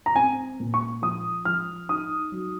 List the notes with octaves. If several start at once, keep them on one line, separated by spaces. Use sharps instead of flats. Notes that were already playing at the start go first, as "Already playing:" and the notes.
A#5
C4 G#5
A#2
C#6
F3 D#6
F3 F6
D#4 D#6
F#3